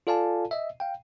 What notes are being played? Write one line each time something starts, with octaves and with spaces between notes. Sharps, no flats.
F4 A4 D5 F5 G#5 A5
D#5 E5
F5 G5